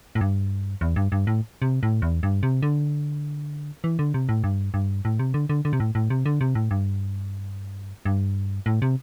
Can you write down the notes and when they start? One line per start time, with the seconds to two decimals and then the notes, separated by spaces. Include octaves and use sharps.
0.15 A2
0.21 G2
0.81 E2
0.96 G2
1.12 G2
1.27 A2
1.62 C3
1.83 A2
2.02 E2
2.23 G2
2.43 C3
2.62 D3
3.84 E3
3.99 D3
4.14 C3
4.29 A2
4.44 G2
4.74 G2
5.05 A2
5.19 C3
5.34 D3
5.49 D3
5.65 D3
5.73 C3
5.80 A2
5.95 A2
6.10 C3
6.26 D3
6.41 C3
6.55 A2
6.71 G2
8.05 G2
8.66 A2
8.82 C3